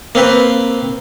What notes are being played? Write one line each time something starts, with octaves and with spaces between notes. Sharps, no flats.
A#3 C4 B4